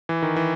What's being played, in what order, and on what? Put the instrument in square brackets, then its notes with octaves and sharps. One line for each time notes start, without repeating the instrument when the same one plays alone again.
[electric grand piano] E3
D#3
E3